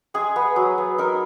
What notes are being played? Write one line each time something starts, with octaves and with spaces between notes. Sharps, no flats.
G#3 G#4
B3
F#3
B3
D#4 A#4